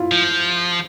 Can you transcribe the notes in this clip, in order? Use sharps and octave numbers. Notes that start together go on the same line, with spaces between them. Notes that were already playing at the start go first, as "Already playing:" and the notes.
Already playing: E4 F4
F3